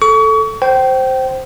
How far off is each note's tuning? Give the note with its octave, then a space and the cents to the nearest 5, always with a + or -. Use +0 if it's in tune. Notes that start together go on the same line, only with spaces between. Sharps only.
A4 +0 C#6 +35
C5 +0 G5 -25